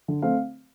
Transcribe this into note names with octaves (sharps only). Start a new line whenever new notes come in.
D3
A3 C4 F5